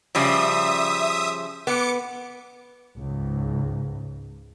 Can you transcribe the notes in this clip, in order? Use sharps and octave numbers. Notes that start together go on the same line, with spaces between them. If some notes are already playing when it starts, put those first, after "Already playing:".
C#3 F3 G3 E5 D#6
B3 D6 C#7
C#2 G#2